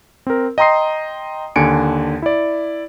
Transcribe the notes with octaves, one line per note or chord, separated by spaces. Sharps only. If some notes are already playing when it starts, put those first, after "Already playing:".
C4 A#4
D#5 G5 A#5 C6 D#6 C7
D#2 D3 G#5 C#7 D7
E4 D5